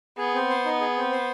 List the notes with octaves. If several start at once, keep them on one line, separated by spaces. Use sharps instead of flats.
B3 G#4
C4
C5
D#4
G#4
C4
C5